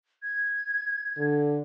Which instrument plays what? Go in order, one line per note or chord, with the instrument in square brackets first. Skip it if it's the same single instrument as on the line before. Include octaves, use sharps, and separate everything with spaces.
[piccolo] G#6
[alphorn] D3